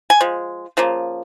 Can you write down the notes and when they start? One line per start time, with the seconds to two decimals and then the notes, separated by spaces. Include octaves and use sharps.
0.10 G#5
0.20 F3 G#3
0.77 C#3 F3 A#3